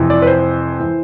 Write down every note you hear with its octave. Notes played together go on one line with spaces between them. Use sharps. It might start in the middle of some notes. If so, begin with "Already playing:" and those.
Already playing: F2 C3 E3
D5
B4
C5
E3